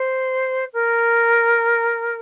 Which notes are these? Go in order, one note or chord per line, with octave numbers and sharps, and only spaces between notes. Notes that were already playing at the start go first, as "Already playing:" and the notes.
Already playing: C5
A#4